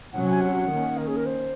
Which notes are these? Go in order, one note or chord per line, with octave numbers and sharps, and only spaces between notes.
C3 F#3 C#4 F#5
F#5
G#5
F#5
D#3 A#3 C#4
A#4
G#4
A#4
C5